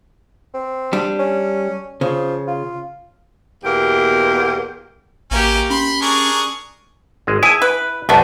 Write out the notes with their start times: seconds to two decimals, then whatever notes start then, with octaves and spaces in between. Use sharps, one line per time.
0.54 C4
0.93 G3 D4
1.19 C#4
2.01 C#3 F3
2.47 F4
3.64 E2 B2 A#3 G4 A#4
5.31 A1 A#3 C#4 G4
5.70 C#4 B5 C6
6.02 D4 G#4 A#4 C#6
7.27 G#1 G#3
7.43 E4 G#4 G#5
7.62 B4
8.09 C2 F#2 D3 A3 B3